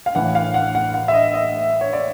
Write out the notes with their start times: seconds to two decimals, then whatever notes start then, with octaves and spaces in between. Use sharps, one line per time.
0.06 F5
0.15 A1 A2 E3 F#5
0.35 F5
0.54 F#5
0.75 F#5
0.94 F#5
1.08 E5
1.14 D#5
1.34 D#5
1.81 C#5
1.93 D5